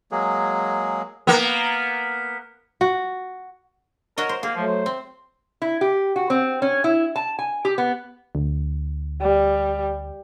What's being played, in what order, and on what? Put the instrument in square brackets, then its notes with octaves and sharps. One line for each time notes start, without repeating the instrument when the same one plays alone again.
[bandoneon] F#3 G#3 A#3 G#4
[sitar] A#3 B3
[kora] F#4
[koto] F#4 C#5 D#5 [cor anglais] A#4
[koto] C5
[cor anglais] A#3 [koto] G#4
[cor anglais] F3 [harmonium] F#3 A3
[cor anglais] C5
[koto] C4
[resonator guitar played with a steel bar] E4
G4
F#4
C4
C#4
E4
A5
G#5
G4
B3
[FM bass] D2
[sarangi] G3